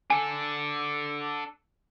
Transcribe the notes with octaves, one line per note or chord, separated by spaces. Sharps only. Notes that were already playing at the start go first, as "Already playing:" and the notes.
D4 A4 G#5